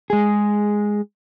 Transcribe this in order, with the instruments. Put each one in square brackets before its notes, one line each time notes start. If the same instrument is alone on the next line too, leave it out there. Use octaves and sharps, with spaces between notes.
[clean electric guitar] G#3 G#4